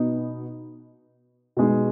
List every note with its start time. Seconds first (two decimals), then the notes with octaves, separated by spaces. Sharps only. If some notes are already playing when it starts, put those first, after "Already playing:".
Already playing: B2 B3 D#4
1.57 B2 G#3 D#4